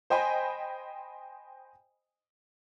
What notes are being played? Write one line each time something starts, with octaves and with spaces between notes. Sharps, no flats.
C5 D#5 G5 G#5 B5